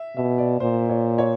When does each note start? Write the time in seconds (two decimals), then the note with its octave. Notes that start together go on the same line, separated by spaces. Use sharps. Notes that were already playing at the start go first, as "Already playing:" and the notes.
Already playing: E5
0.17 B2 E5
0.38 D5
0.60 A#2 C5
0.89 C#5
1.18 C#5